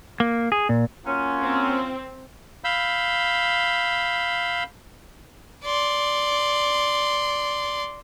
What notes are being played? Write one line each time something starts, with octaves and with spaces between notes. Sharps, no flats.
A#3
G#4
A#2
F#3 A#3 C#4 F4
C4
F5 B5 E6 G6
D5 C6